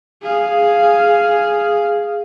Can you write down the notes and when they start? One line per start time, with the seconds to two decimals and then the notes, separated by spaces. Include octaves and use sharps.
0.23 G#4 F5